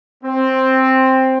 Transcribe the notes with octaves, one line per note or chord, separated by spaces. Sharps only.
C4